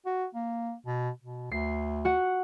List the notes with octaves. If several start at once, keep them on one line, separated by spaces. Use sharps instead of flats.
F#4
A#3
B2
B2
D2 C7
F#4 F#5